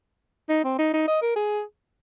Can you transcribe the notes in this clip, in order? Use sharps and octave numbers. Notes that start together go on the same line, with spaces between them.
D#4
C4
D#4
D#4
D#5
A#4
G#4